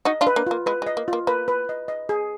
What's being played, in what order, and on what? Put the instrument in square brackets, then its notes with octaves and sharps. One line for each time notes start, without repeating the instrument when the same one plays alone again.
[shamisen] D#4 F#4 [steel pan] D#5
[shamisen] D4 F4
[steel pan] B4
[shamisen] A#3 D4
[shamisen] A#3 [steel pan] F4
[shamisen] G#3 [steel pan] B4
[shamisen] G#3
[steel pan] D#5
[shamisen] A#3
[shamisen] A#3 [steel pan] F4
[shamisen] A#3 [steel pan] B4
[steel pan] B4
D#5
D#5
G#4